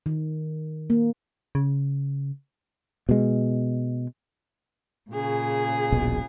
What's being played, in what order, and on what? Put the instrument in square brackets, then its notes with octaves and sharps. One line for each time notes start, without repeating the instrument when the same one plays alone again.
[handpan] D#3
A#3
[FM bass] C#3
[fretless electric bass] B2 G#3
[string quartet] A#2 C#3 G#4
[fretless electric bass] D#1 A#1 B2